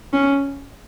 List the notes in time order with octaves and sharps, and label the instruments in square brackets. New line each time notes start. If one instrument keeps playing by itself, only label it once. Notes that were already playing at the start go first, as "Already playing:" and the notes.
[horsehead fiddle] C#4